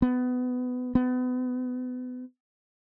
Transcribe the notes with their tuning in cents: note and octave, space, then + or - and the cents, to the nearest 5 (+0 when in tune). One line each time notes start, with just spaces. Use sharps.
B3 +20
B3 +30